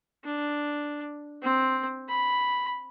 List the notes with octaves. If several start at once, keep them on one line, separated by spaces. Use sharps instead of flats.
D4
C4
B5